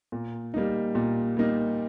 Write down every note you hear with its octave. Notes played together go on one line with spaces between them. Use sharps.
A#2
G3 A#3 D#4
A#2
G3 A#3 D#4